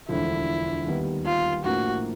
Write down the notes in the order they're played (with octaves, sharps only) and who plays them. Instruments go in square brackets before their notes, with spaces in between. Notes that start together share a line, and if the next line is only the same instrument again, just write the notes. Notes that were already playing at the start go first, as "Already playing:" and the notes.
[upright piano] E1 D2 D3 F3 [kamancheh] E4
[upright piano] D#2 D#3 G3 B3
[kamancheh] F4
[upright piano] A#1 A2 F3 A#3 [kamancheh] F#4